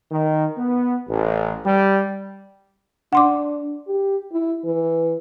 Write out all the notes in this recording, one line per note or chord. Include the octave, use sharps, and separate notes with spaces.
D#3
B3
A1
G3
D4 F#5 C6 D6
G4
E4
E3